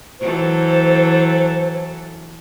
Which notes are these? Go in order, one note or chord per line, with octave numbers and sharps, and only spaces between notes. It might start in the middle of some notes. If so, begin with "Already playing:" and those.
E3 F#3 A4 C5